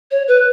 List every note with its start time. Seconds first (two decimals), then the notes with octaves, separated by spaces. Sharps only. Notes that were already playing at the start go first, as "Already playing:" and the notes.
0.11 C#5
0.28 B4